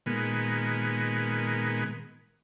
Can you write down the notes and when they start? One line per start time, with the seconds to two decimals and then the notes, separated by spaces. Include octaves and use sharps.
0.06 A#2 D#3 G#3 B3